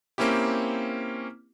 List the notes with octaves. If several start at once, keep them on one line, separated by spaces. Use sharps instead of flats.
A#3 C4 C#4 E4 G4